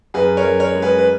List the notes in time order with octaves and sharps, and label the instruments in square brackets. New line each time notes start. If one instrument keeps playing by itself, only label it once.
[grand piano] F#2 G#4 B4
A#4 C#5
F#2
A#4 C#5
G#3
G#4 B4
B4